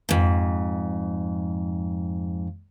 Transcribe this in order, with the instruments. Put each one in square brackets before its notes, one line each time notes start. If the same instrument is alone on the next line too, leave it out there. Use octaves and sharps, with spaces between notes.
[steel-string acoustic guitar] F2 G#2